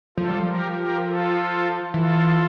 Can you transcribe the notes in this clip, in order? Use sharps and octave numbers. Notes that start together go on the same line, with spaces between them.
F3 F4 A4
G3
F3
G4 A#4
G4 A#4
F4 A4
E3 F4 A4